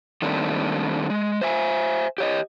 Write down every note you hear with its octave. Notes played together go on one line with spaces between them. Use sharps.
D#3 G3 A3 A#3 C4 D4
G#3
C5 E5 G#5
G4 C#5 D#5